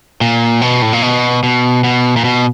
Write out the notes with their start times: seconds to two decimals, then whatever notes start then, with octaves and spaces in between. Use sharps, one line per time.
0.21 A#2
0.61 B2
0.82 A2
0.93 A#2
1.02 B2
1.43 B2
1.84 B2
2.17 A#2
2.24 B2